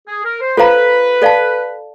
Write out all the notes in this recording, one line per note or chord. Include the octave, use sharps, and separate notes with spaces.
G#4
A#4
C5
F4 A4 B4 C5 F5 A#5
A4 D5 F5 A5